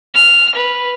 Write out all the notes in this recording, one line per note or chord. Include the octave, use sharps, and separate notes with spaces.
F6
B4